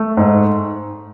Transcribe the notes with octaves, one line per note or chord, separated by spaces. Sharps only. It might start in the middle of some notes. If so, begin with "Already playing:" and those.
Already playing: A3
G#2